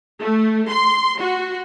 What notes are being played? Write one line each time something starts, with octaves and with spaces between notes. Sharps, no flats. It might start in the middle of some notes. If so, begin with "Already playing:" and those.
A3
C6
F#4